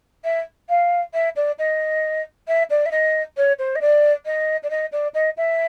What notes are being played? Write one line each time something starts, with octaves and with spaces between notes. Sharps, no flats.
E5
F5
E5
D5
D#5
E5
D5
E5
D#5
C#5
C5
D#5
D5
D#5
D5
D#5
D5
D#5
E5